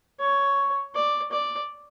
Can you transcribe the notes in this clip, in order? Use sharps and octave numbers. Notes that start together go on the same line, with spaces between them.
C#5
D5
D5